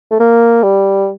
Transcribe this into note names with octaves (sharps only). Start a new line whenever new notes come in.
A3
A#3
G3